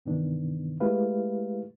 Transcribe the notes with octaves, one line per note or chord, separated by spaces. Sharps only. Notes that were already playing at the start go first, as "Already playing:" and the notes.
G2 C3 D#3 E3 B3 D4
G#3 A3 E4 G4 B4 F5